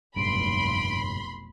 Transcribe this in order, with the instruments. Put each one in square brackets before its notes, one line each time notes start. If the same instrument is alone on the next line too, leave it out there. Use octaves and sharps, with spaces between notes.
[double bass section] F1 B1 [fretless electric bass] G2 A#2 C#3 [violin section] B5 C6 [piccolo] D7